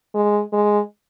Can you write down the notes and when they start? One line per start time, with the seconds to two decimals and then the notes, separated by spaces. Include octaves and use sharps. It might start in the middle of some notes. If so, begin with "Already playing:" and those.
0.15 G#3
0.53 G#3